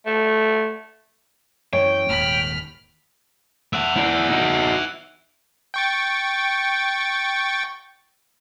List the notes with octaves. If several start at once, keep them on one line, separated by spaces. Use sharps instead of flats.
A3
F#2 E3 C#5 G5
D#1 D#2 G#2 B5 F6
E5 F#5
E4 D5
D#4 F#4
G5 C#6 A6